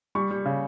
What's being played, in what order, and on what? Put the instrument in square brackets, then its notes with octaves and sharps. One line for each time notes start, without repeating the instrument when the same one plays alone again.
[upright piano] G3 C#6
G3
C#3